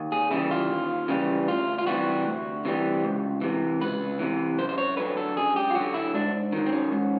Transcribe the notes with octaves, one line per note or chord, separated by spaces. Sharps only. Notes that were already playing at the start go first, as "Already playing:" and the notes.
Already playing: D#2
G#4
C#3 E3 G3 E4
F4
D#2
C#3 E3 G3
D2 F4
F4
C3 E3 G3 F#4
D2
C3 E3 G3
C#2
C3 E3
C#2 B4
C3 E3
F#2 C5
C5
C#5
D3 F#3 B4
A4
F#2 G#4
G4
F4
D3 F#3 F#4
E4
G#2 D4
D#3 F#3
C4
C#4
G#2